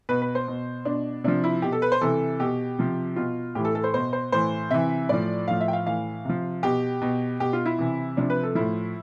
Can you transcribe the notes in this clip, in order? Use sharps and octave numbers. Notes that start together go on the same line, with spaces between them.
B2 B4
B4
C5
B2
B2 D4
C3 F3 D4
E4
B2 G4
A4
B4
C5
C3 E3 A4
B2 G4
C3 F3
B2 F4
A2 E3 G4
A4
A4
C5
B2 C5
C5
A2 E3 C5
C3 E3 E5
A2 F3 D5
A2 F3 F5
E5
G5
F5
A2 E3 F5
C3 F3
B2 G4
B2
B2 G4
F4
E4
C3 E3
C3 F3 D4
B4
A4
A2 F3 E4